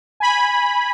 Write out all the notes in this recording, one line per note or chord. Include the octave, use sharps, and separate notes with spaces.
G#5 B5